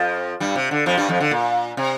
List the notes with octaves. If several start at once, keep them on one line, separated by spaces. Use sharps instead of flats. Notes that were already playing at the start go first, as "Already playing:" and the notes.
Already playing: F2 F3
G2 G3
C3
D3
F2 F3
G2 G3
F2 F3
D3
A#2
C3